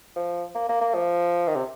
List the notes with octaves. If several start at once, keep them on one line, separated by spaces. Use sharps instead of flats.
F3
A#3
A#3
A#3
F3
D#3
C3